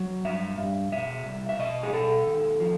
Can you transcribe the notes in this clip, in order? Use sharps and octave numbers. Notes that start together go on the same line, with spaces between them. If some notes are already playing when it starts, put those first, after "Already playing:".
Already playing: F#3
G2 E5
G2
B2 E5
C2
E5
B2 D#5
G#4
B2 A4
D#2
F3